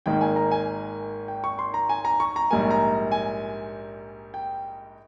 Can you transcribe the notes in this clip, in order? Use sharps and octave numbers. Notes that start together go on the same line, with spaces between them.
G#1 G#2 D#3 A#3 G5
G#5
A#5
G#5
G5
C#6
C6
A#5
G#5
A#5
C#6
A#5
A#1 G#2 G3 A#3 G#5
A#5
G#5
G5